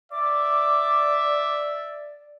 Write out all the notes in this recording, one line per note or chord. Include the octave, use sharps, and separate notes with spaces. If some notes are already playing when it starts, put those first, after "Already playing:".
D5 E5 D6